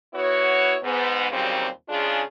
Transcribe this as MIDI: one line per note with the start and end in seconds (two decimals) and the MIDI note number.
0.15 0.76 59
0.15 0.76 64
0.15 0.76 66
0.15 0.76 73
0.82 1.30 44
0.82 1.30 59
1.31 1.66 39
1.31 1.66 46
1.31 1.66 49
1.31 1.66 54
1.31 1.66 55
1.31 1.66 60
1.89 2.22 49
1.89 2.22 56
1.89 2.22 62
1.89 2.22 65
1.89 2.22 68